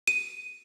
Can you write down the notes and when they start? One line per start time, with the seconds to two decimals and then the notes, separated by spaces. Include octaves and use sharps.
0.08 D#7